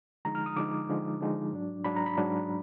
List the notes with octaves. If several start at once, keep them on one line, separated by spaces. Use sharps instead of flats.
D3 F3 G#3 D#4 A#5
F6
D#6
D3 F3 G#3 D#4 D6
D3 F3 G#3 D#4
D3 F3 G#3 D#4
G#2 F#3 D4
G#2 F#3 D4 B5
A#5
B5
G#2 F#3 D4